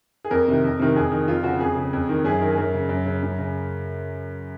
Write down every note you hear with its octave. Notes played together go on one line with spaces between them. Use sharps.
G#4
F2 A#4
C3 D#3
F2
C3 D#3
F2 G#4
D#3
F2 F4
C#3 F#4
F2 G#4
C#3
F2
D#3
F#2 G#4
D#3 A#4
G#4
F#2 A#4
C#3
F#2
C#3
F#2
C#3